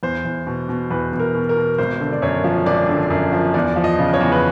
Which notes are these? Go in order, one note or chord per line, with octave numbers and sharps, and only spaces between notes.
E2 C5
E2
B2
B2
E2 B4
E2
A#4
B2
A#4
B2
G#1 C5
D3
D5
F#2 C#5
F3
G#1 D5
D3
F#2
F3
E2 D5
F3
D#5
C#3
C#5
E2
B4